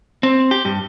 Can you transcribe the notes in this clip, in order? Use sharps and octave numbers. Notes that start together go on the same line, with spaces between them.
C4
G4
G2